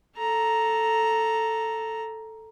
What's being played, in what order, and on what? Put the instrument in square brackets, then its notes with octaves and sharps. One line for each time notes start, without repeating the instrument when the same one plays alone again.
[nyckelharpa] A4 A#5